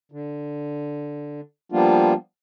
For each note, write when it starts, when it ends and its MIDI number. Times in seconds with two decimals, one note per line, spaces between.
0.12 1.41 50
1.72 2.13 53
1.72 2.13 55
1.72 2.13 58
1.72 2.13 59
1.72 2.13 62
1.72 2.13 65